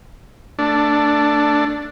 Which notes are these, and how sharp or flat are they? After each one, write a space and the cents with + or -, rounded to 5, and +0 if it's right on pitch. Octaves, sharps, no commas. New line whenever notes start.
A3 +25 D4 +0